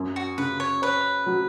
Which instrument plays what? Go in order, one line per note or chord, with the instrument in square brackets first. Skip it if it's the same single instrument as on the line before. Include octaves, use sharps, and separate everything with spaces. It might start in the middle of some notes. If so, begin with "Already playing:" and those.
Already playing: [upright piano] F#2 C#4
[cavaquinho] F#4
[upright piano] C#3 [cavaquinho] B4
[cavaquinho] C#5
[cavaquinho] B4 [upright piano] C#5
[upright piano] F#3